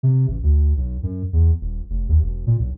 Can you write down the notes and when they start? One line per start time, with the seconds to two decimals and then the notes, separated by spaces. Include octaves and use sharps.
0.03 C3
0.28 A1
0.43 D2
0.77 B1
1.03 F#2
1.33 E2
1.61 D#1
1.90 F1
2.09 D#2
2.23 E1
2.47 A#2
2.60 B1